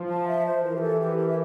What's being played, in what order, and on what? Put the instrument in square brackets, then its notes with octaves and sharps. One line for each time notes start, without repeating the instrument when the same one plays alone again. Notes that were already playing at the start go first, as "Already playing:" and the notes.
Already playing: [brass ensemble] F3
[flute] A5
E5
C5
[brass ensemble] E3 [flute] A#4
[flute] G4
A4
G4
A#4
E5